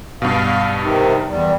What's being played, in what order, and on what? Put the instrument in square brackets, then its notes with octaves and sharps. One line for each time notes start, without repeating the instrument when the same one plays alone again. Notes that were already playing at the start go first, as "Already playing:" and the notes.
[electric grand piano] G2 B2 [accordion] F5
[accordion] C3 D#3
E2 G3